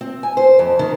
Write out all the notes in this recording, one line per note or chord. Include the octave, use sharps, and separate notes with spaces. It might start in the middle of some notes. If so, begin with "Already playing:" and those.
C4
G#5
C5
F2
D#3